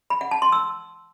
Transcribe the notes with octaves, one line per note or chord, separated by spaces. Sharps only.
B5
F#5
A5
C6
E6